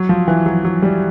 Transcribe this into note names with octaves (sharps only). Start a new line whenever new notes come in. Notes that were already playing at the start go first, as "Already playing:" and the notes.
Already playing: F#3
F3
E3
F#3
F#3
G3